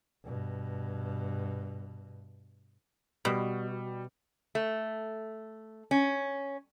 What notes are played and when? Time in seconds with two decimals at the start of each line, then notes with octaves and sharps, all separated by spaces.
0.24 G2 B2
3.25 B2 G3
4.55 A3
5.91 C#4